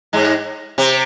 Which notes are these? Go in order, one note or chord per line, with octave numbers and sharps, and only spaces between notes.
G#2 G#3
C3 C4